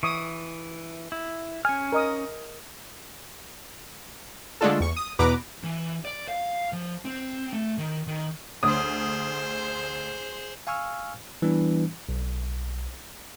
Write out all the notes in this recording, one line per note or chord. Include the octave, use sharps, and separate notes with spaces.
E3 C#6 D#6
E4
C#4 G#5 F6
A#4 D#5 D#6
D3 G#3 A3 D4 F4 A4
E2 C#6
D#6
E2 B2 B3 B4 A#5 D6
E3
D5
F5
F3
C4
A3
D#3
D#3
D2 G#4 C5 D#6
F5 G#5 C#6 E6 F6
E3 G3 B3 D4
B1